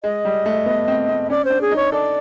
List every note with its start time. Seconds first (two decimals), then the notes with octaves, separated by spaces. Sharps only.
0.03 G#3 D#5
0.25 G3
0.46 A3
0.66 B3
0.88 C4
1.09 C4
1.30 C#4 D5
1.45 C5
1.50 D4
1.61 G#4
1.71 D#4 C#5
1.92 A4 D5